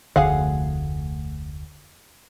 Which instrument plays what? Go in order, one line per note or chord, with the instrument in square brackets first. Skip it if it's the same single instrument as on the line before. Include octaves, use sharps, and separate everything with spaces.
[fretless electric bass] F1 D2 D3 [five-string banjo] G#4 F5 F#5